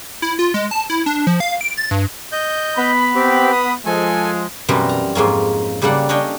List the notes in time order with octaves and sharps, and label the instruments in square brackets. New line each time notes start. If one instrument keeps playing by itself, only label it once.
[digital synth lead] E4
F4
G#3
A5
E4
D4
F3
F5
D7
A6
G2
[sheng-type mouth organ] D#5 G6
[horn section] B3 B5
[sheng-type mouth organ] C4 G4
D#6
[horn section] F3 G#3 [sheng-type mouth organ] A4 G#5
[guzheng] F#2 B2 E3 G3 C4 A#4
A#5
F2 G#2 A#3 C#4
C#3 G3 A#3 A4 D5 F#5
C#4 D4 C#5 D#5 G5